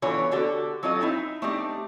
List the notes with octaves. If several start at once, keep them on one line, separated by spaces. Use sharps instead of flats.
D3 E3 B3 F4 C#5 A#5
D3 F#4 G4 A4 D5
F#3 C4 F4 A4 D#5
C4 D#4 E4
A3 C4 D4 D#4 G4